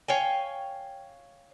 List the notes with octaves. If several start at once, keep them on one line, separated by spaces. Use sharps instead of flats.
C#5 F5 G5 G#5